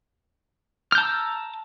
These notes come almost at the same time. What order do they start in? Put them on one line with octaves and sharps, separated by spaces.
F6 G6 A5 A#5 E6